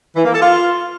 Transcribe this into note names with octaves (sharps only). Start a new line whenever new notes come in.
E3
A#3
A4
F4